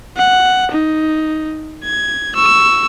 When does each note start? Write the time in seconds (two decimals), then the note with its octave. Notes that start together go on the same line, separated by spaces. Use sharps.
0.17 F#5
0.71 D#4
1.84 G#6
2.36 C#6 E6